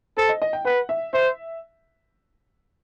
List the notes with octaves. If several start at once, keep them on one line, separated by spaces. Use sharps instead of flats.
A4 C5
D#5
D#5
G5
B4 F#5
E5
C5 E5